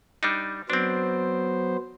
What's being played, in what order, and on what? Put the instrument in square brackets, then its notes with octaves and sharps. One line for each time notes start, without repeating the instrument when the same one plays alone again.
[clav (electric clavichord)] G3 D4 D#4
[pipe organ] F#3 B3 C5 [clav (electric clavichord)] C4 D4